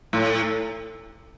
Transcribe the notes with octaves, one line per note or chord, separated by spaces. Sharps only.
A2